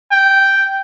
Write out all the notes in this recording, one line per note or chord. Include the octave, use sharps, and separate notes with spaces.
G5